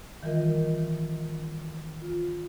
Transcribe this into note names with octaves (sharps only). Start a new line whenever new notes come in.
D#3 E3 G3 F4 A#4 D#5
F4